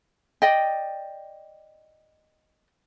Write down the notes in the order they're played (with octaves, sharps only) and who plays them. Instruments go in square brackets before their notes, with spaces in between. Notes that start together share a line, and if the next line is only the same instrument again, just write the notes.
[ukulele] D5 D#5 G5